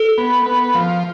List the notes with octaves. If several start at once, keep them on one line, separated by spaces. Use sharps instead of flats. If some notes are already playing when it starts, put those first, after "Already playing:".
Already playing: A4
B3
B3
F3